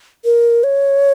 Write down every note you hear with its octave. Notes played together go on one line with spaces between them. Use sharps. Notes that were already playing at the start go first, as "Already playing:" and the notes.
A#4
C#5